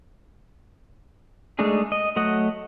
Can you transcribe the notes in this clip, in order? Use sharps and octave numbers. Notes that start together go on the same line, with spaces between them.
G#3 A3 D4 D#4 G#4
D#5
F#3 A3 D#5 F#5 D#6